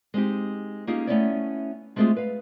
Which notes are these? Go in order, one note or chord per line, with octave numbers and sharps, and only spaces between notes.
G#3 C4 D#4 G4
A#3 C#4 D#4 F4 G4 G#4
A3 B3 C#4 E4 C#5 D5
G#3 A3 C4 F4 F#4 G#4
B4 F5